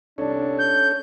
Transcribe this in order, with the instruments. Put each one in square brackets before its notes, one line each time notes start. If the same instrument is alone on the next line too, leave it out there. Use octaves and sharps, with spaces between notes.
[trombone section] C2 D4 [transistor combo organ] C#4 A4 C#5
[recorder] G6